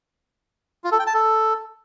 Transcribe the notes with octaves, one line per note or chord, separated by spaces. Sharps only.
F4
A4
G5
A5
A4